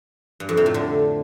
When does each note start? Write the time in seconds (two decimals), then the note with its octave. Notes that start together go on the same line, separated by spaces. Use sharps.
0.40 G2
0.49 F2
0.57 C3
0.66 A2
0.74 D3